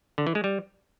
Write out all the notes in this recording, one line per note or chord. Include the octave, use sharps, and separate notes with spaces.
D3
E3
G#3
G3